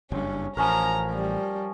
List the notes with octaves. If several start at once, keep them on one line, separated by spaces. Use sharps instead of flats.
F#1 G2 C#4
A1 F3 C#4 A#4 A#5
G3